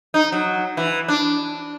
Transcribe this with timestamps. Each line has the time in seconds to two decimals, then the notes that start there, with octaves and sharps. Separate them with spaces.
0.14 D#4
0.32 F#3
0.77 E3
1.08 D4